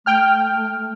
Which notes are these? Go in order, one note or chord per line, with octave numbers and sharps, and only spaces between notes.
A3 G5 F6